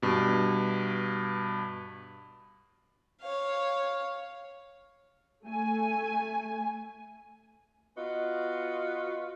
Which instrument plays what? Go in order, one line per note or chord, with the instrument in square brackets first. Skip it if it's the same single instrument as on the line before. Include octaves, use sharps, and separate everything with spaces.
[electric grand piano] G2 B2
[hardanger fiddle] C#5 F5
[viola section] A3 G#5
[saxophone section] B3 F4 F#4 D#5